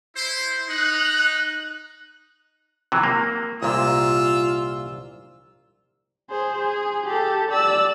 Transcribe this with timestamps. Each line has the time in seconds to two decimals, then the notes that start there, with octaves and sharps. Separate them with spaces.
0.15 E4 C5
0.68 D#4 F#6
2.92 C3 E3 F#3
3.03 A#3
3.63 C2 A#2 F4 E6
6.30 G#4 C5
6.58 G#4
7.06 G4 A4
7.52 D5 E6